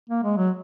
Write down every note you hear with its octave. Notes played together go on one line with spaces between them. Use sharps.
A#3
G#3
F#3